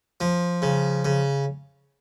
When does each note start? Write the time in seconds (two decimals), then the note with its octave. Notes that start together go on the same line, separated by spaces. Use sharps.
0.21 F3
0.62 C#3
1.05 C#3